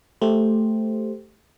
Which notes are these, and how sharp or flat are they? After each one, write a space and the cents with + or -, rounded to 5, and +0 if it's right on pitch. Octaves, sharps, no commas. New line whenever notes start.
A3 +0 G4 +0 C5 +0